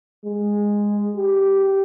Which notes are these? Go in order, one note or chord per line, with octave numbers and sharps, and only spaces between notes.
G#3
G4